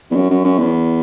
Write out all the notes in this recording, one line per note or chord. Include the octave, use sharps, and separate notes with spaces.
E2
F#2
F#2
F#2
E2